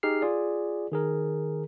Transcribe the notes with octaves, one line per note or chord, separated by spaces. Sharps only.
D#4 G4 G#4 F6 C7
F4 G#4 D5
D#3 G#4 A#4